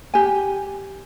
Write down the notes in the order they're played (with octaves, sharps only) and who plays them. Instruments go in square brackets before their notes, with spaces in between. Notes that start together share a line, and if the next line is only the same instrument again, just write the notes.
[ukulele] G4 G#5